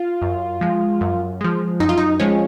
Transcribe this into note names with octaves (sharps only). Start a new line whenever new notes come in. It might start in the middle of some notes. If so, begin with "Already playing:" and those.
Already playing: F4
F#2
F3 G#3
F#2
F3 G#3
F#2 D#4
F4
D#4
F3 G#3 C#4